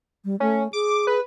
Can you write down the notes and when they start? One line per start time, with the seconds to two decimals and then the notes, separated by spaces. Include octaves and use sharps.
0.25 G3
0.40 A3 C#4
0.73 G#4 D6
1.07 B4